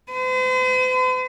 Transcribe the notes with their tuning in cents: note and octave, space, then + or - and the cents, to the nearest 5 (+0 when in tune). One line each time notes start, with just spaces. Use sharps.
C5 -45